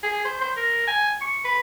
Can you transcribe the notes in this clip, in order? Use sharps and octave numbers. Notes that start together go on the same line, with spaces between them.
G#4
C5
C5
A#4
G#5
C#6
B4